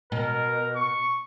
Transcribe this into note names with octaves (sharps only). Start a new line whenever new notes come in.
B2 A#4
C#6